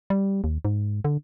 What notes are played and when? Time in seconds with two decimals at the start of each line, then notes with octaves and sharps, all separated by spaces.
0.10 G3
0.44 D#2
0.65 G#2
1.05 D3